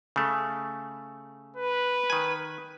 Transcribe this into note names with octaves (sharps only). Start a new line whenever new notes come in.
C#3 A3
B4
D#3 G#5